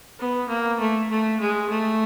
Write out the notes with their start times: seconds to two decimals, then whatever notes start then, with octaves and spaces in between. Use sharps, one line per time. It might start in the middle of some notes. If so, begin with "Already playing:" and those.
0.19 B3
0.49 A#3
0.80 A3
1.10 A3
1.40 G#3
1.70 A3